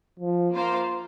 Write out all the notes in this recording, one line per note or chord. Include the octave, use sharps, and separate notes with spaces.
F3
A#3 F4 C5 F5